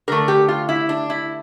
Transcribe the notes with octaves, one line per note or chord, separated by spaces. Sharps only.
D3 A3 A#4
G4
F4
E4
D4
E4